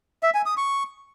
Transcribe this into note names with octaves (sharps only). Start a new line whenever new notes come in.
E5
G#5
D#6
C#6